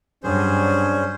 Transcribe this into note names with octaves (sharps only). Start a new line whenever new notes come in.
G2 F#3 C#4 D4 G#4 C5